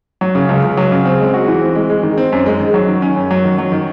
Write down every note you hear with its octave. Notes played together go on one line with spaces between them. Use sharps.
F#3
C#3
C#2
C#2
F#3
C#3
C4
G#3
F#4
E3
C4
G#3
G#3
D#3
C4
F#2
G#3
D#3
F#3
D#3
C#4
F#2
F#3
D#3
F#3
D#3